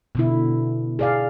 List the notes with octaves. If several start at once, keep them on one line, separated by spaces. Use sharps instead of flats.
B2 D3 E4
G#4 D5 F5